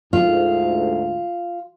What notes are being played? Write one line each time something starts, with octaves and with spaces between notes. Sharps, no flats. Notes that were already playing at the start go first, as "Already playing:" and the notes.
D2 G#2 F4